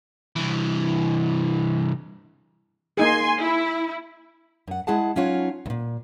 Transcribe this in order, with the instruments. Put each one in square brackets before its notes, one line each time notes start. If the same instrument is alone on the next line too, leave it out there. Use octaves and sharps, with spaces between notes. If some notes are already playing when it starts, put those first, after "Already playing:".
[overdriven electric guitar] C2 E3
[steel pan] A#3 D#4 G#4 [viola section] G#5 C6
[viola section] E4
[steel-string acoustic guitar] F#2 F#5
G#3 E4 G#4 F#5 A5
F#3 C#4 D#4 F4 C#5 F#5
D2 A#2